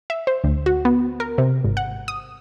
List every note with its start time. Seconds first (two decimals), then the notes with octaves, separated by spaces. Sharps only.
0.10 E5
0.27 C5
0.44 D2
0.66 F#4
0.85 B3
1.20 A#4
1.38 C3
1.64 G#1
1.77 F#5
2.08 D#6